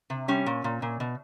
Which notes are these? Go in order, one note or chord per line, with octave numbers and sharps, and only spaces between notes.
C3
G3 C#4
A#2
A#2
A#2
B2